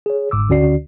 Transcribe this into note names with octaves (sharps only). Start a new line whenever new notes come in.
G#4 C#5
G1 G#2 D6 E6
D2 D3 C#4 F#4 D5 C7